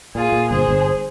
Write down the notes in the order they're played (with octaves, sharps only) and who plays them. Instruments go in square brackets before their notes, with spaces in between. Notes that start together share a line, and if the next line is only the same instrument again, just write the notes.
[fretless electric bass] A#2 [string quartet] F4 G#4
[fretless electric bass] A#2
[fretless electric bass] G1 [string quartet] G#4 C5
[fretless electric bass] G1